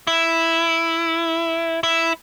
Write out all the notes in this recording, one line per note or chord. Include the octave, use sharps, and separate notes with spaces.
E4
E4